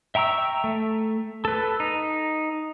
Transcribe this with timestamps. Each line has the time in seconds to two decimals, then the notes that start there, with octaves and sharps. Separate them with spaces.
0.15 E5 G5 A#5 C#6 E6
0.64 A3
1.45 A4 B4
1.80 D#4